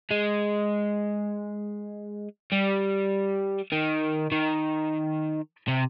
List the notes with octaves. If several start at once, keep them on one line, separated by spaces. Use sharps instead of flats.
G#3
G3
D#3
D#3
C3